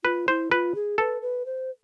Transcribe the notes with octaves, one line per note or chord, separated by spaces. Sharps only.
F4 B4
E4 C5
F4 B4
G#4
A4 B4
B4
C5